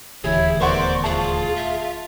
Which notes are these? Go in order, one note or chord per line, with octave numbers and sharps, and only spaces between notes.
D#1 D2 E3 E4 G4 G#4 C#5
B3 A#4 C5 D5 F#5 C#6
F4 G#4 A5
E5